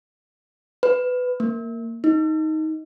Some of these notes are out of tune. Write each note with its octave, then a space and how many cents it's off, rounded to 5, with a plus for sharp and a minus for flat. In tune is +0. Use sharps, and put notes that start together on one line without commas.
B4 +15
A#3 -15
D#4 +10